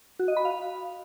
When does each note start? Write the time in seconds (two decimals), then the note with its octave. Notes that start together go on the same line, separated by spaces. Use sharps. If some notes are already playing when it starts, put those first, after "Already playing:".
0.19 F#4
0.28 D#5
0.37 B5
0.45 F5